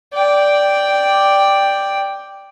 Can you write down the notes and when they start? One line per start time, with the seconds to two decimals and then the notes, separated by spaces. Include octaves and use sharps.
0.14 D5 G5